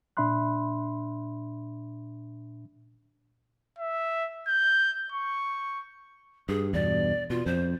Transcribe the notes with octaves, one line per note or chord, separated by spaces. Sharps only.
A#2 D4 E5 B5 C6 F#6
E5
G6
C#6
G2 G#4
E2 G2 B2 D5
B2 F4
F2 C5